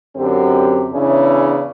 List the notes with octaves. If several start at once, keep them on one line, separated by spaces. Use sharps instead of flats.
F#2 D3 C4 G4
E2 C#3 C#4 D4 E4